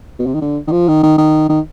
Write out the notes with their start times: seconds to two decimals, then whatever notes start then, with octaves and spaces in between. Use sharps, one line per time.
0.19 B2
0.26 C3
0.34 D#3
0.41 D3
0.67 D#3
0.72 F3
0.88 D#3
1.03 D#3
1.18 D#3
1.49 D#3